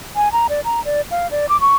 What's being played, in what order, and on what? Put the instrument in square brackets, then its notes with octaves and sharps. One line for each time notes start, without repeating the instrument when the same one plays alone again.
[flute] G#5
A#5
D5
A#5
D5
F5
D5
D6
C#6